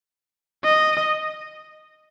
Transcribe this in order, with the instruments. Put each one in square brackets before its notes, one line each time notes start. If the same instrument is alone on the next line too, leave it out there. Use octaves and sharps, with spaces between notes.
[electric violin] D#5